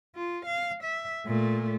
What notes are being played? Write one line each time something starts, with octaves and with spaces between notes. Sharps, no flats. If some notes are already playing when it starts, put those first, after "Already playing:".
F4
F5
E5
A#2 A3